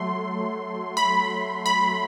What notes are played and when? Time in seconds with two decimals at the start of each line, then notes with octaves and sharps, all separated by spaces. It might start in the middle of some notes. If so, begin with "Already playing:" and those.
Already playing: F#3 A3 C6
0.97 B5
1.66 B5